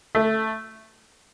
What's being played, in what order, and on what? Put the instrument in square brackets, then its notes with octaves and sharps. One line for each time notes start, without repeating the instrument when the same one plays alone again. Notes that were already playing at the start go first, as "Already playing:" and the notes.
[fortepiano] A3